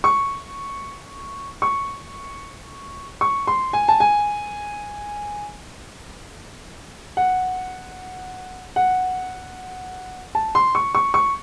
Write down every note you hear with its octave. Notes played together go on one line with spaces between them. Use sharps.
C#6
C#6
C#6
C6
G#5
A5
G#5
F#5
F#5
A5
C6
C#6
C#6
C#6